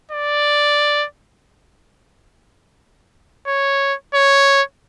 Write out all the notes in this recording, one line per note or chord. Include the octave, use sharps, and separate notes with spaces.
D5
C#5
C#5